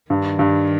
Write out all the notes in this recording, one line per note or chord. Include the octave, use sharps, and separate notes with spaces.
G2 D#3
G2